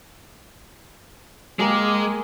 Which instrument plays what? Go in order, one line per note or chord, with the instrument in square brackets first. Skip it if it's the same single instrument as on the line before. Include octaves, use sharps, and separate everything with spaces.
[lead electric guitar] G#3 [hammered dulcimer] A#3 G4 G#4